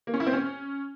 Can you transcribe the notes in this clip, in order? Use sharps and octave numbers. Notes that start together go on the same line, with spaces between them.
A#3
C#4
E4
C4
C#4